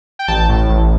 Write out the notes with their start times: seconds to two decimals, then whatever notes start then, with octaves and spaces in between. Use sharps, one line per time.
0.19 G5
0.28 A1 A5
0.49 A2
0.69 A1